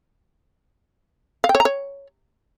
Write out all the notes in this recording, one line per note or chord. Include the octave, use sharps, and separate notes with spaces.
F5
G5
C#5
A#5
C#5